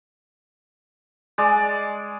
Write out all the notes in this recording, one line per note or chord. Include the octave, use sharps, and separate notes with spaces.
G#3 D5